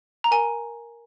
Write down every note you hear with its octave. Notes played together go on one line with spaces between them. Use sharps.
A#5
A#4 G#5